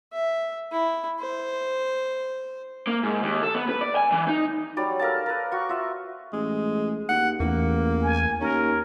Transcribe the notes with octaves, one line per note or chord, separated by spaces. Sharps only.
E5
E4
C5
A#3
G#2
D#2
A4
B3
B4
D5
G#5
E3
D#4
F#3 G3 D5 B5
A4 A#4 F5 A5
A#4 B4
F#4 C#6
F4 E5
A1 G#3
D#2 F#5
A1 E2 A#3
G#5
D#2 C#4 A#4